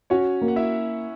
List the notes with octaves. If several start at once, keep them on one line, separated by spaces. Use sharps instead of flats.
C#4 F#4 C#5
A#3
F#5
E4 E5